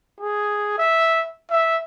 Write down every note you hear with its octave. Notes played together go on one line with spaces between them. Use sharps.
G#4
E5
E5